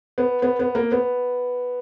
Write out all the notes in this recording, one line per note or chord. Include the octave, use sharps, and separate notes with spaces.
B3
B3
B3
A#3
B3